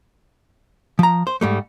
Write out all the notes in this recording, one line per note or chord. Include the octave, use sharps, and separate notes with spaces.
F3 A#5
C5
G#2 G3 A3